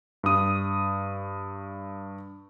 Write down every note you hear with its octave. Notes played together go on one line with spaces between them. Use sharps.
G2 D#6